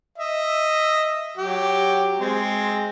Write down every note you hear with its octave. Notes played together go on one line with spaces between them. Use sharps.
D#5 E5
F#3 G4
G#3 C4